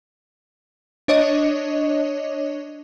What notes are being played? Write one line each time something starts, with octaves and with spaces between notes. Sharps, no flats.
D4 C#5 D#5